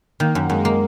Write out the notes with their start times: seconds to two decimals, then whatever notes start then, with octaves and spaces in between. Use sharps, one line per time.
0.20 D#3 A#3
0.35 F#2
0.50 F#2 G#3
0.65 A#3